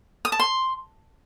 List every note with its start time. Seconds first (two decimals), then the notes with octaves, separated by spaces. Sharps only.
0.25 D#6
0.32 A5
0.39 C6